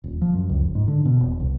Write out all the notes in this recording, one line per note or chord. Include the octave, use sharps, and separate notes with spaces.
D#1
F3
F#2
C#2
F1
G#2
D3
B2
E1
C2